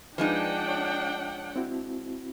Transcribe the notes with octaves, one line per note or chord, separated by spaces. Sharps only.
F3 G#3 D4 D#4 B4 F#5 G5
C#5
C4 E4 F#4